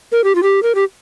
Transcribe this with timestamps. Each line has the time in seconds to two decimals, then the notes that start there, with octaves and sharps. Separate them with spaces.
0.12 A#4
0.24 G4
0.35 F4
0.43 G4
0.63 A#4
0.75 G4